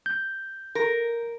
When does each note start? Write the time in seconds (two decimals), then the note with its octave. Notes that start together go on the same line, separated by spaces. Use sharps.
0.06 G6
0.75 A#4